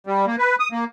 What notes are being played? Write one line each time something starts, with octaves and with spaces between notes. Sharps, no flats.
G3
A#3
B4
D#6
A#3